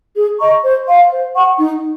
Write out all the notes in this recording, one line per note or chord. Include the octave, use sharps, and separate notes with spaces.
G#4
D#5 A#5 C#6
C5
F5 C6
C5
F#5 C#6
D#4